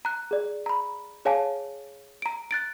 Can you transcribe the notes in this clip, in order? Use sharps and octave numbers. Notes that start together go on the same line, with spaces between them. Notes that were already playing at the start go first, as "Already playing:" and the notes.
A#5 F#6
G#4 D5
A#5 B5
G#4 C#5 F5 G#5 A5
A#5 D7
F#6 A6 D7